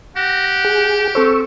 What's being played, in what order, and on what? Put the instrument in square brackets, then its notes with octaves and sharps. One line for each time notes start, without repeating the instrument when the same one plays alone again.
[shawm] G4 [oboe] F#5 [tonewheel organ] A#6
[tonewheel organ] G#4
[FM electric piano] C4 A4 C5 [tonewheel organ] C#6 E6